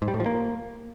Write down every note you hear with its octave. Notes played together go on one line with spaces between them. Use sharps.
G#2
G3
A2
F3
A#3